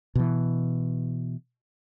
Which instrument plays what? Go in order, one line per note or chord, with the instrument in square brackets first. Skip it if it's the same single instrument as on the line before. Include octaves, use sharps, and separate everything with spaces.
[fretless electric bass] B2 E3